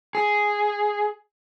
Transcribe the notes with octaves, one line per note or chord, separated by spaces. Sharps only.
G#4